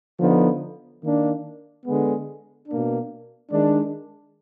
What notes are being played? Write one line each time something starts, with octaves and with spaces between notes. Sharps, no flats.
D3 F3 B3 D#4
D#3 A#3 D4
D3 G#3 B3
B2 A#3 D4
D#3 G#3 D4